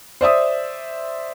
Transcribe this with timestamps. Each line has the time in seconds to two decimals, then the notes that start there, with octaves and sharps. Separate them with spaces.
0.21 C5 D5 E5 D#6